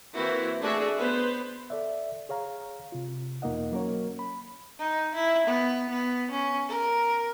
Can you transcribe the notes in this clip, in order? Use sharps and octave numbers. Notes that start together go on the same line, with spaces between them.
E3 A#3 C4 E4 F#4
A3 D4 F#4 G#4 E5
B3 B4 C5
A4 D5 E5
G#4 C#5 F5 A#5
C3 F4
E2 B2 A#3 D#4 D#5 F#5
F#3 A#3 C#4 A#4 C#5
B5
D#4
E4
B3
B3
C#4
A#4